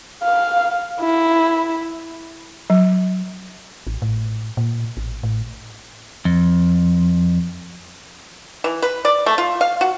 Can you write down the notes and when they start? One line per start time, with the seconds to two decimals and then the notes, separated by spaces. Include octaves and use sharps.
0.23 F5
1.00 E4
2.70 F#3
3.87 A1
4.02 A2
4.57 A#2
4.97 A1
5.23 A2
6.25 F2
8.64 E3
8.82 B4
9.05 D5
9.26 A3
9.38 F4
9.61 F5
9.81 F#4